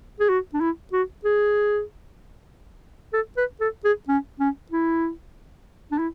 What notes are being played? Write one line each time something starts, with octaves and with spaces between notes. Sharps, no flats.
G#4
F#4
D4
E4
F#4
G#4
A4
B4
A4
G#4
C#4
C#4
E4
D4
E4